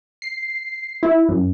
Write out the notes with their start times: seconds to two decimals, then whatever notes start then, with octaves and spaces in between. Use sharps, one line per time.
0.22 C7
1.03 E4
1.29 F#2